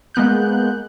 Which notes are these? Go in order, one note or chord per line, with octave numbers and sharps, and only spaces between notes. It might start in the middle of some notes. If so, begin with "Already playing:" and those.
G#3 A#3 B3 F#6 G6